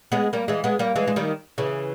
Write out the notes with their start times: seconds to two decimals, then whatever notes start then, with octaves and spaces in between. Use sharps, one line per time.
0.12 G#3 B3
0.33 G3 A#3
0.48 E3 G#3
0.64 G#3 B3
0.79 G3 A#3
0.96 E3 G#3
1.08 G#3
1.16 D#3 G3
1.58 C#3 E3